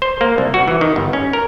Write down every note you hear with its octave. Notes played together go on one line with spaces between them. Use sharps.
C5
A#3
C2
F#4
E3
D#3
G1
C#4
A#4